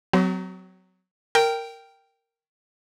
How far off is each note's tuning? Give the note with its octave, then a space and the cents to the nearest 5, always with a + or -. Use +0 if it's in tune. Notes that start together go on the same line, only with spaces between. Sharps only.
F#3 +0 C4 -40 F#4 +40
A#4 -10 G5 +0